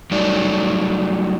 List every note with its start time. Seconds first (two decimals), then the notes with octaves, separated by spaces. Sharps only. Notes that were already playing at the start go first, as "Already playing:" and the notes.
0.11 F#3 G3 A3 D#4 D5